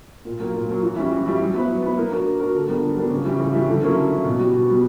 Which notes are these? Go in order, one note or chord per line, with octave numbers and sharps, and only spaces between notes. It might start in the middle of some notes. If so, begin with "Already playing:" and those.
A#2
F#3 A#3
A#2
F#3 A#3
E3
G3 C#4 E4
E3
G3 C#4 E4
F#3
B3 E4 B4
F#3
B3 E4 B4
A#3
D4 F#4 A#4
A#3
D4 F#4 A#4
D3
G3 B3 D4 A#4
D3
G3 B3 D4 A#4
C#3
E3 G3 C#4 E4
C#3
E3 G3 C#4 E4
D3
F#3 A#3 C#4 E4
D3
F#3 A#3 C#4 E4
B2
G3 B3 F#4
B2
G3 B3 F#4